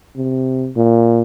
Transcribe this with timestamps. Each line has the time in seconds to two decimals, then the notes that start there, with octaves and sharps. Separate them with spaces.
0.17 C3
0.76 A#2